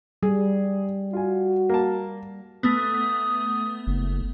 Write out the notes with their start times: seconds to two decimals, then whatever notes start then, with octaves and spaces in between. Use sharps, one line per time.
0.23 G3 G#4
1.13 F4 F#4 G#5
1.69 A#3 A5
2.63 A3 B3 D#6
3.87 F#1